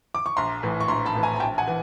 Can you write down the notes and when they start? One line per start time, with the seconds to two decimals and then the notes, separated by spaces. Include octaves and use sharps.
0.15 D6
0.26 C#6
0.37 A#1 A#5 C6
0.63 A2 E3
0.81 C#6
0.88 A#1 A#5 C6
1.05 A5 B5
1.15 A2 E3
1.23 G#5 A#5
1.36 A#5
1.40 A#1 G5 A5
1.58 F#5 G#5
1.68 E3